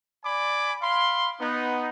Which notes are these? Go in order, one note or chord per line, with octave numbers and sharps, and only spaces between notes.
D5 G#5 B5 D6
F5 B5 C6
B3 D#4